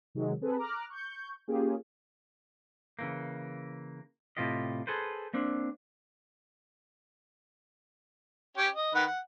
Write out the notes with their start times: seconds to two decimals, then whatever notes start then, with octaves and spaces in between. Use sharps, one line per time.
0.15 C3 D#3 F#3 G#3
0.41 C4 G#4 A4 B4
0.57 A#5 D6 F6 F#6
0.90 C#6 G6
1.48 A#3 C#4 F4 G4 G#4
2.99 C#3 E3 A#3
4.37 A2 C3 G#3 F4 G4 D#5
4.87 G#4 A4 B4 C5
5.33 A#3 C4 D4
8.57 C#4 G4 C#5
8.76 D#5
8.95 D#3 B4 F#5
9.06 F#5